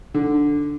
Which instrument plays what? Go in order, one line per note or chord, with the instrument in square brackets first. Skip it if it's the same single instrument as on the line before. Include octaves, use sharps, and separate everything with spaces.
[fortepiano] D3